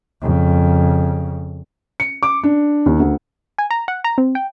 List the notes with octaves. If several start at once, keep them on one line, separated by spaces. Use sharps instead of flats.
F2 C#3
C#7
D6
D4
D#2
D2
G#5
A#5
F#5
A#5
C4
G5